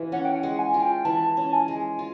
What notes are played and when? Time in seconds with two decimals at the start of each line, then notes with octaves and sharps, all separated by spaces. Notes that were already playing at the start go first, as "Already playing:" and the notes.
Already playing: E3 F4
0.12 C#4 F#5
0.25 G5
0.36 F#5
0.43 G#3
0.59 G#5
0.74 F4
0.82 G5
1.05 E3 A5
1.29 A5
1.37 C#4
1.53 G#5
1.68 G#3
1.75 G#5
1.99 F4